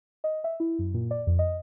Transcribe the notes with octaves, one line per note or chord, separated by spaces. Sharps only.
D#5
E5
E4
F#2
A#2
D5
F2
D#5